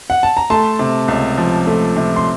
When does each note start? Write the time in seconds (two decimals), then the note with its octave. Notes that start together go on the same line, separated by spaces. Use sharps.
0.10 F#5
0.23 A5
0.37 A#5
0.50 A3 A5 C6
0.79 C3
1.08 C#2
1.38 F3
1.67 A3
1.96 C3
2.16 C6